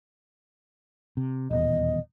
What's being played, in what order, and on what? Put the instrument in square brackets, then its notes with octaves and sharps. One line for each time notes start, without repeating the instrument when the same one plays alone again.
[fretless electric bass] C3
[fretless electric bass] D#1 E2 B2 [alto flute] D#5